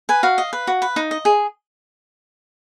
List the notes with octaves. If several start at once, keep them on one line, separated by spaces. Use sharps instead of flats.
B4 G#5
F#4 F5
D#5
B4
F#4
B4
D#4
D#5
G#4